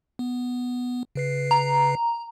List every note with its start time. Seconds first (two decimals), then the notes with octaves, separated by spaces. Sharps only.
0.19 B3
1.15 C#3 B4 C7
1.51 A#5